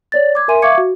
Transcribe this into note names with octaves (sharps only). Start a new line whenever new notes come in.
C#5 D5 A6
D6 G#6
A#4 E5 G#5 C6 D#7
E5 F5 C#6 D6 G#6 C#7
F#4